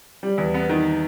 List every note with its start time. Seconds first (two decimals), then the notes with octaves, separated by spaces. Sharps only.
0.23 G3
0.38 E2
0.54 B3
0.69 D#3